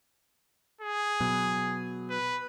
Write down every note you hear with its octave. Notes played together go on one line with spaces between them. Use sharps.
G#4
B2 F#3
B4